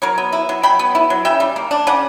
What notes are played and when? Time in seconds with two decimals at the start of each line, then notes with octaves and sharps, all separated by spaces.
0.02 F#3 A#4 C#5
0.18 B3
0.32 E4
0.49 F#3
0.63 F#3 G5 B5
0.79 B3
0.95 E4
1.10 F#3
1.25 C#3 E5 G5
1.40 G3
1.56 A#3
1.71 D4
1.87 C#3 D5 F#5